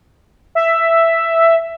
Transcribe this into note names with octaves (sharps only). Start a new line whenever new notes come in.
E5